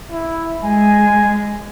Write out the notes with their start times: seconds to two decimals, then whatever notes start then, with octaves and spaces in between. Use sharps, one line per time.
0.11 E4
0.64 G#3 G#5